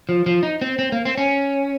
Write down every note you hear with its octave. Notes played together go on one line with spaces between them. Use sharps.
F3
F3
D#4
C4
C4
A#3
C4
C#4